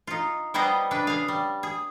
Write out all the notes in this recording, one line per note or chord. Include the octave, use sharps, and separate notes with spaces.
D#4 F4
G3 B3 G4 G#4 C5 D#5
C#3 D4 B4
G#4 F5
G3
G#4